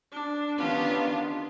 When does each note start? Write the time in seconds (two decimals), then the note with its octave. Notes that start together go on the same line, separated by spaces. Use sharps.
0.12 D4
0.58 D#3 B3 C#4 D4 F4 G4